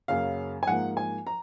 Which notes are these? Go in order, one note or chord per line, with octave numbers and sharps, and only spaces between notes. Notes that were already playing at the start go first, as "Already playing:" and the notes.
F#2 C#3 F#3 A#3 F5
G#5
G#2 F3 A#3 F#5
G#5
A#5